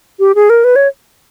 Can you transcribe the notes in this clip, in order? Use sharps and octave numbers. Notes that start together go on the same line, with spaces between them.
G4
G#4
A#4
B4
C#5